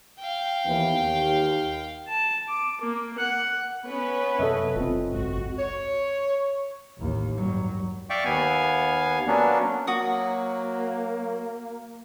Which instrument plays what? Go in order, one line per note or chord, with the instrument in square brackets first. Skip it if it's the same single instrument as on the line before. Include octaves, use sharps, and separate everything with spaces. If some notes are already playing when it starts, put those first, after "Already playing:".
[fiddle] F5 G5
[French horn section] D#2 E3 B3
D#2
[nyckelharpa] A5
D6
A#3
F#5
[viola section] B3 C#4 B4
[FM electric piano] F#2 C3 [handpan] A4 D#5 E5
[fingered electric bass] F#1 C4 [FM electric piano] F4
[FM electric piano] G#1 C#2 G#2 [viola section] F#4
[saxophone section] C#5
[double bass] A1 D#2
G2 F#3
[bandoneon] D5 E5 F5 G5 C#6 D6
D#2 B3 F5 G#5
F#3 A#3 B3 C#4 D4
[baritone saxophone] F#3 [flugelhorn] A#3 [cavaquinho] F#4 D#6